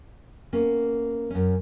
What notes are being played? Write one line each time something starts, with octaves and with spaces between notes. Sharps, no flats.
A#3 B3 C#4
F#2 C#4